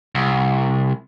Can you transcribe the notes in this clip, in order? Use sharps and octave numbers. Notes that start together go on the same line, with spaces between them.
C2